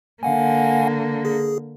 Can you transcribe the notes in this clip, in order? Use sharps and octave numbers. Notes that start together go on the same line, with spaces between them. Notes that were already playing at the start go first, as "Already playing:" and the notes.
D3 A#3 F5 F#5 G#5
G#4